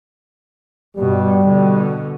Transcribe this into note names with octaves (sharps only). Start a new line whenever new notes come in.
G2 B2 G3
B2 D3